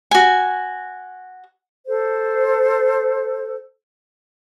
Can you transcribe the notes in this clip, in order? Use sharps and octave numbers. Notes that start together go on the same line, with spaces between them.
F#4 G#5
A4 C5